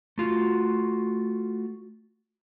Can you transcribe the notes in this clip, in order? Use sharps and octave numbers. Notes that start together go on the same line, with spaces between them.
A3 F4 F#4